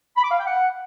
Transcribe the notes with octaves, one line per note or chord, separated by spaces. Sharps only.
B5
D6
F5
G5
F#5